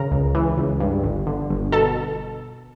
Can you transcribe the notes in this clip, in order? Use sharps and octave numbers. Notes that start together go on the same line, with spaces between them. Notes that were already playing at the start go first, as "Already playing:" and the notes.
Already playing: C#3 A#4 A#5
C#2
E3
C#2
G2
G1
D3
G1
B2 A4 A5